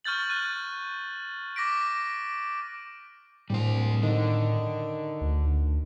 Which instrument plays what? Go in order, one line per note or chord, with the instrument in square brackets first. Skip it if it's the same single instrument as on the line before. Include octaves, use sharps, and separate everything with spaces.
[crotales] C#6 F6 G6 A6 F#7
F6 F#6 D#7
D6 A#6 B6 D7
[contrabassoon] D1 [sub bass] A2 [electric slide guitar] G3 C5
[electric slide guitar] D3 [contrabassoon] D#3
[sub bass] D2